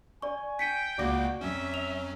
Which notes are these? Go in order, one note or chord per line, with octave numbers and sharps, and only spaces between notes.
D5 G#5 C#6
G5 B6 C#7 D#7
C#2 C#3 A#3 F#4 D5 D6 A#6
F2 F#3 C#4 C#5 E5
F7